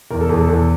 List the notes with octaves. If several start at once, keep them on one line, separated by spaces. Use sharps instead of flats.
E2 A#4
A4
E2 G#4
A4
E2